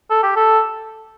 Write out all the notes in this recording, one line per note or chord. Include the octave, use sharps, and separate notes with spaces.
A4
G4
A4